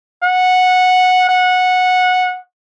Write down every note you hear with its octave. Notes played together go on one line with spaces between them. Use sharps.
F#5
F#5